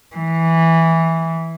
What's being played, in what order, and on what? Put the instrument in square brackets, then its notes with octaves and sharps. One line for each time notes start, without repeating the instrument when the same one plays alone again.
[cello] E3